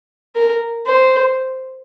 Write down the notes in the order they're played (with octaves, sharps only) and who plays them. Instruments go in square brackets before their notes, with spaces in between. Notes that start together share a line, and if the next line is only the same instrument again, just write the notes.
[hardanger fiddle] A#4
C5